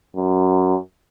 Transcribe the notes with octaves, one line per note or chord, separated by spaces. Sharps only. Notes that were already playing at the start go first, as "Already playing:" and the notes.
F#2